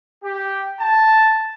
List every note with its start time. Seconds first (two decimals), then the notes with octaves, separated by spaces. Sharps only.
0.23 G4
0.80 A5